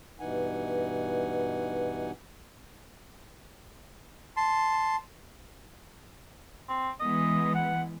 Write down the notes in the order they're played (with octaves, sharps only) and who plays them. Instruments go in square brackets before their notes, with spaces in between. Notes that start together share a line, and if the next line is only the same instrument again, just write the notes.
[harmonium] G2 B2 E3 D#4 F#5 G#5
[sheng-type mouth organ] A5 C6
[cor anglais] C4
[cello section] E3 G#3 B3 [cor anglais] D#5
[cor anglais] F#5